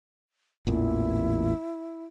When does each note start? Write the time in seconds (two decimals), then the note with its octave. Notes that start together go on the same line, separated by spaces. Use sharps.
0.67 A1 E2 A#2 E4